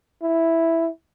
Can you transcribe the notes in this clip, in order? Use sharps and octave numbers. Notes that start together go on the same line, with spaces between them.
E4